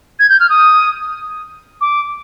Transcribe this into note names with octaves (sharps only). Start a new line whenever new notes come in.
G#6
G6
F6
D#6
D6